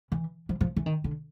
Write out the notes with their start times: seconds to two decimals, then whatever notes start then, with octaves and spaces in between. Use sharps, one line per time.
0.12 E3
0.49 F3
0.61 F3
0.76 E3
0.86 D#3
1.04 D3